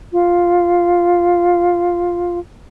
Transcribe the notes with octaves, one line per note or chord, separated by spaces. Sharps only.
F4